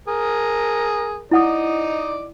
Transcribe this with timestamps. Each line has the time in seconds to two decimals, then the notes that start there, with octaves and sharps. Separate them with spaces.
0.08 G#4 A#4
1.31 D#4 E4 D5 D#5 F#5 D#6